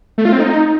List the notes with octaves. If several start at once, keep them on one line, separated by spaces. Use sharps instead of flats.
A3
F4
C4
D#4